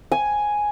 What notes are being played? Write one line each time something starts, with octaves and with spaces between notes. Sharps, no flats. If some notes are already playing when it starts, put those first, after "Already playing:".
G#5